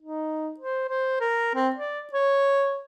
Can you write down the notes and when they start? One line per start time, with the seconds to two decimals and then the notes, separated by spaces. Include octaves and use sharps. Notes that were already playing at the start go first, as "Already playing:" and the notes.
0.02 D#4
0.60 C5
0.89 C5
1.21 A#4
1.55 C4
1.76 D5
2.13 C#5